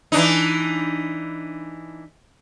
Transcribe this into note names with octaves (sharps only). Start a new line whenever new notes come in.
E3 D4 D#4